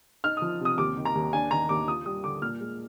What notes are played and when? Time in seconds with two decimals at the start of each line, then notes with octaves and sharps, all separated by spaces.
0.24 D#4 F6
0.37 F3 D#6
0.60 C3
0.65 D#6
0.78 D#2 D6
0.97 D#3
1.05 A#5
1.15 D#2
1.33 D4 G#5
1.51 D#3 A#5
1.69 D#2 D6
1.88 F4 D#6
2.05 G3 D#6
2.24 D3 D6
2.42 A#2 F6
2.60 G#3